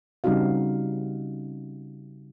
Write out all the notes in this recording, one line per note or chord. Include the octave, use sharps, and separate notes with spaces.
C#3 G3 C4 D#4 F#4 F5